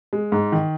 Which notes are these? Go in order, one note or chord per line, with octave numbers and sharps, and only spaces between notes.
G#3
G#2
D#3